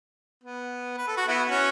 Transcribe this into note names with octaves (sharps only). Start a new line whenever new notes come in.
B3
B4
A4
F#4
B3 E4
C#4 F#4